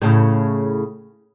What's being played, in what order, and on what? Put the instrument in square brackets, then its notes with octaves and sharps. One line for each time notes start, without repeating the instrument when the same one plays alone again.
[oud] A2 C#3